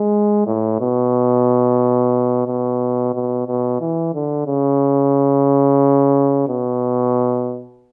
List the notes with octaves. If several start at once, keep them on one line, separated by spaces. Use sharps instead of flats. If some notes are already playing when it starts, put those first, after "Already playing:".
Already playing: G#3
A2
B2
B2
B2
B2
E3
D3
C#3
B2